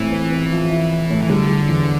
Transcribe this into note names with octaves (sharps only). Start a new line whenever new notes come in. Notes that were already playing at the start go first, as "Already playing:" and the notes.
Already playing: A2 E3 C4
C4
C4
F3
E4
E4
A2
E3
D3 G3
G3
E2